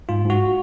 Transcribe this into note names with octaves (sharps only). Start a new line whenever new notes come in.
G#2 F4
G#2 F#4